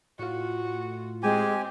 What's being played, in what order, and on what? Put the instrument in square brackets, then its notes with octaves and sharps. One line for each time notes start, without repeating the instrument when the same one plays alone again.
[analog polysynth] A2 F4 [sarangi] F#4
[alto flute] G#3 [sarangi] C4 [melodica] G4 G#5